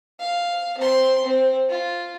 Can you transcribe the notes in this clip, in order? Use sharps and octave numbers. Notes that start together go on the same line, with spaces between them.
F5
C4 C6
C4
F4